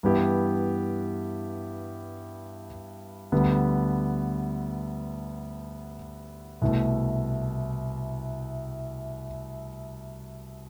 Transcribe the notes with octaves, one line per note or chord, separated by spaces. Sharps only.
G2 E3 B3 E4 G4
D2 D3 G3 B3
C2 B2 A3